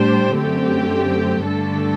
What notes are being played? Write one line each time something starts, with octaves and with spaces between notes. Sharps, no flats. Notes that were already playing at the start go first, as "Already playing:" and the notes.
Already playing: A2 G3 D4 G4 C5
F#2 D3 A3 C4 G4
G2 D3 A3 D4 A4